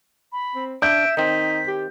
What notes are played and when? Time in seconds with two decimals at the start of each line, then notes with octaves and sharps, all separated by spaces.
0.32 B5
0.55 C4
0.82 D4 E5 G6 D7
1.17 D#3 C4 D#4 B6
1.68 G4